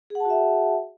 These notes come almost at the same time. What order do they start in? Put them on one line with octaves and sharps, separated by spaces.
G#4 F#5 A5 F#4 E5